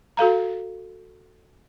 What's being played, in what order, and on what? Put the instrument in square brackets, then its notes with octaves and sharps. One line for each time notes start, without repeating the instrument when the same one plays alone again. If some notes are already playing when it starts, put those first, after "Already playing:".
[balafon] F#4 A4 F5 A#5